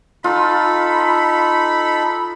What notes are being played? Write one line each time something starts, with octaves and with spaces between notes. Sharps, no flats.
D#4 F4 A4 B5